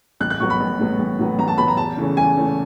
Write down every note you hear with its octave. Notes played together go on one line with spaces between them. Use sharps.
A1 F#6
F#6
A2 F#3 B3 C#6
B5
A1
A2 F#3 B3
A1
A2 F#3 B3
A1 A#5
A5
A2 F#3 B3 B5
A#5
E2 A5
C#3 E3 A3 C#4
E2 G#5
C#3 E3 A3 C#4